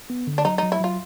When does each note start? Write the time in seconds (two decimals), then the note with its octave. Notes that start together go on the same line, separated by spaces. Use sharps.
0.10 B3
0.27 D3
0.38 D4
0.45 F#3 D#4
0.58 F#3 D#4
0.72 E4
0.80 F#3 F4